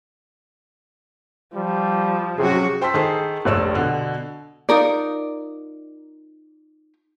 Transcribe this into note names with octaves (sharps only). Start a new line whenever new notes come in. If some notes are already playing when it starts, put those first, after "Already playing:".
F3 G3
C3 F#3 C#4 F#4 G#4
C5 G5 A5 C6 E6 B6
D#3 G#4 A4 C5
F1 A#1 C#5 E6 E7
B2 D3
D#4 F4 A#4 D5